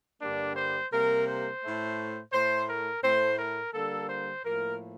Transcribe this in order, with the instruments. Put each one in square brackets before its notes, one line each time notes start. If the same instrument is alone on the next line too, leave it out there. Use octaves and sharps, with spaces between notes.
[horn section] G2 D3 G3 A#3 D4
C5
C3 G3 A#3 A#4
C5
A2 A3
A2 A3 C5
A#4
A2 A3 C5
A#4
D3 G3 A#3 A4
C5
A2 F3 A#3 A#4